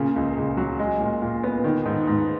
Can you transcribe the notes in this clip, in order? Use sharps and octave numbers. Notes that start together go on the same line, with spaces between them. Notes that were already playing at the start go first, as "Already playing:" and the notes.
Already playing: A#2 C#3
C#2
C#2
F#3
G#3
A#2
A#2
B3
D#3
G#2
G#2